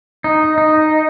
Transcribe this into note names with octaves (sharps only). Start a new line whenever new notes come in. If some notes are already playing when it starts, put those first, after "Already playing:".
D#4
D#4